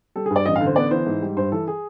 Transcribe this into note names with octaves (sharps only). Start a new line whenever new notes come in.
G3 A4
G#4
G2
D5
A1 D#5
F5
D3
C5
B3 D5
E3 C5
G#2
G3
G2 C5
E3 A4
G#4